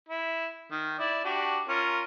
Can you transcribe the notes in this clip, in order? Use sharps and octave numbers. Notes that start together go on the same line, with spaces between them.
E4
D#3
E4 D5
D4 F#4 G4
C#4 F4 A#4